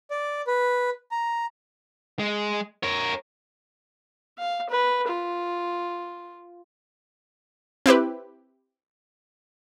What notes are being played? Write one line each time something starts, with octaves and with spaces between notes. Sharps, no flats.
D5
B4
A#5
G#3
A#4 C#5
F5
B4
F4
C4 E4 G4 B4